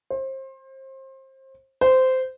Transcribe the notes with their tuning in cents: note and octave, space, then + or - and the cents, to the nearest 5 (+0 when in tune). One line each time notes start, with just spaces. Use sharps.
C5 +30
C5 -15